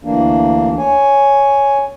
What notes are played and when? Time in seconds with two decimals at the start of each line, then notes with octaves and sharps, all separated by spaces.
0.05 D2 E3 A#3 D4
0.78 C#5 G#5